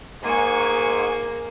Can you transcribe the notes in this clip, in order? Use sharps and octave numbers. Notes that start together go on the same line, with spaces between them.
G#2 A#3 G#5 C#6